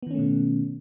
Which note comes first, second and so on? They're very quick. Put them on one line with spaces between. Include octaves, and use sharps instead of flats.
B3 D#3 C#4 A3 B2